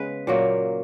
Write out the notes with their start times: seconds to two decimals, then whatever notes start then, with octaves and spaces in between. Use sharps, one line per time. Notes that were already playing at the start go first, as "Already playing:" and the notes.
Already playing: C#3 G#3 B3 B4
0.27 A#2 F#3 A#3